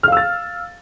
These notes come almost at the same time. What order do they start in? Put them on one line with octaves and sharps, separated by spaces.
F6 F5 E6 A6